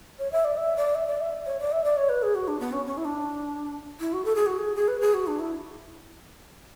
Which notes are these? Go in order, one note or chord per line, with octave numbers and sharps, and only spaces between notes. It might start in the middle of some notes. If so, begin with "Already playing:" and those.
C#5
E5
D5
E5
D5
E5
D5
E5
C#5
D5
E5
D5
C#5
B4
G#4
F#4
D4
B3
C#4
C#4
E4
D4
E4
F#4
A4
G#4
F#4
G#4
G#4
B4
G#4
F#4
D4
E4